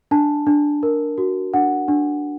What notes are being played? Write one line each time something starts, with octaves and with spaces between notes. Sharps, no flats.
D4 A5
D4
A#4
F#4
D4 F#5
D4